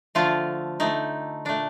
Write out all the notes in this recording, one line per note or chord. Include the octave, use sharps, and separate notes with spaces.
D3 F3 A3 F4
D3 A3 D#4
A#2 A3 D4